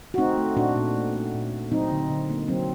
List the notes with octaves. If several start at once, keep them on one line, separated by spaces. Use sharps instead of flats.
F#4
A3 C4 D#4
A3
A#2 D4 F#4
A#2
A3
A3
A#2
A#2
F#3 C4 D#4
D3
D3
A#3
F#3 C4